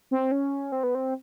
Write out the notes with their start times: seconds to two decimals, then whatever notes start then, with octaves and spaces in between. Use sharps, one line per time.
0.11 C4
0.32 C#4
0.72 C4
0.83 B3
0.95 C4